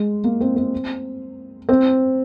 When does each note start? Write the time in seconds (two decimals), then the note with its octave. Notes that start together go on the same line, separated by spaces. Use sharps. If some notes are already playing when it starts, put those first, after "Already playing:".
Already playing: G#3
0.24 A#3
0.41 C4
0.56 C4
1.69 C4